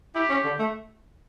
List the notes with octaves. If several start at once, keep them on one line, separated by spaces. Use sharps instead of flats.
E4 G4
C#4
D3
A3